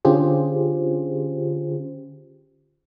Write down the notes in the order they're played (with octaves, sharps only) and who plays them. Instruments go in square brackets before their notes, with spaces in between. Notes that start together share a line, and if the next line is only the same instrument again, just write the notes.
[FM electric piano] D3 C#4 F4 G4 G#4 C5